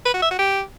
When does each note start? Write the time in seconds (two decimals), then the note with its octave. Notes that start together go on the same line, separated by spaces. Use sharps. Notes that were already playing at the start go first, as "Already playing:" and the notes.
0.05 B4
0.14 F#4
0.22 E5
0.31 F#4
0.39 G4